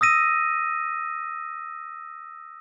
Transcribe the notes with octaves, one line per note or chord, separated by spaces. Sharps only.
D#6 E6 A#6 D#7